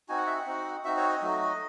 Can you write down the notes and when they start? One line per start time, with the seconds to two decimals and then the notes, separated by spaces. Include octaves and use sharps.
0.09 C4 D#4 F#4 G#5
0.17 F#5
0.27 E5
0.37 F#5
0.46 C4 D#4 F#4
0.85 C4 D#4 F#4 E5
0.97 C#5
1.09 D#5
1.21 F#3 A3 D#4 F#4